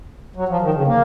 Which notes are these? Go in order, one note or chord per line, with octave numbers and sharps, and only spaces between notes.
F#3
F3
D#3
C#3
A#3